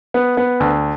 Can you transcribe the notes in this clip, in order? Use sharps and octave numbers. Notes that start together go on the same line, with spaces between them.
B3
B3
D2